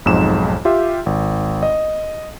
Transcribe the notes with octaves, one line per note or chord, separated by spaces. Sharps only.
B1 F2 G#2 D#4 E7
F4 G4 E5
G#1
D#5